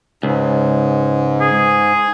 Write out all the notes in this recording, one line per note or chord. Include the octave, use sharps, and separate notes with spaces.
C#2 G#2
G#4